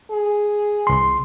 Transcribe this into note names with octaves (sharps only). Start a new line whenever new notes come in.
G#4
C2 C6